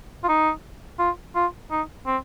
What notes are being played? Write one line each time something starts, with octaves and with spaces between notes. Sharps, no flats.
F4
D#4
F4
F4
D#4
C4